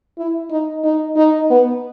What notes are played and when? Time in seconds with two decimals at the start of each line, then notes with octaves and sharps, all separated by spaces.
0.18 E4
0.51 D#4
0.84 D#4
1.17 D#4
1.50 B3